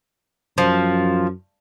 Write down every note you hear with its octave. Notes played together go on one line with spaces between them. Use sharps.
F#2 F3